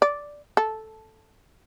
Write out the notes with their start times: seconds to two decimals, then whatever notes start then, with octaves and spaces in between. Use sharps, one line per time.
0.02 D5
0.57 A4